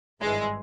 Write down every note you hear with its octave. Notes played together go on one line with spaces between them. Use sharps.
G#1 G2 E3 G#3